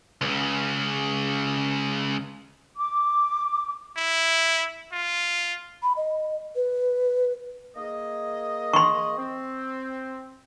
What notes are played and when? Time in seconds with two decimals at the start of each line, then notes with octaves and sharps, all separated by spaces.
0.21 C#2 C#3
2.77 D6
3.97 E4
4.92 F4
5.83 B5
5.97 D#5
6.56 B4
7.75 A#3 G#4 D#5
8.73 C6 C#6
9.17 C4